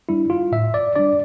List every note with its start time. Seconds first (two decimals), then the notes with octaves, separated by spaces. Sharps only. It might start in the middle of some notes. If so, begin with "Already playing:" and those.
0.09 G3 D4 E4
0.30 F4
0.52 A2 E5
0.74 D5
0.96 G3 D4 D5